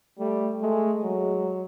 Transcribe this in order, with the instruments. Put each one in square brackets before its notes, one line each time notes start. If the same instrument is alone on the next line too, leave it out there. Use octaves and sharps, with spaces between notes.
[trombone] G3 [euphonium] A3
[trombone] G#3 [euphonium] A3
[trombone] F#3 [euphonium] G#3